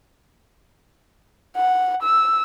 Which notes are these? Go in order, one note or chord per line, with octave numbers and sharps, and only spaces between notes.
F#5
E6